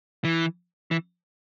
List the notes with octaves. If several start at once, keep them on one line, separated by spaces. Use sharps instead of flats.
E3
E3